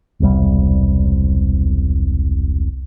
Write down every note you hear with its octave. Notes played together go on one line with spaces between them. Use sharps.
E1 C2 G3